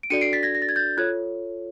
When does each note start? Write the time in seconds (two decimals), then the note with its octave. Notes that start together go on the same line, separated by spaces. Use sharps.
0.03 D7
0.10 D4 F#4 A4 D5 C#7 D#7
0.21 C7 D7
0.33 A6 B6
0.43 G#6 A#6
0.55 A#6
0.62 A6
0.69 G#6
0.76 G6 A6
0.97 F4 A4 C#5 F#6 G#6